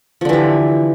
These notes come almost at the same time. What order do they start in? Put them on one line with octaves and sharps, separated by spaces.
F3 D3 E3 G4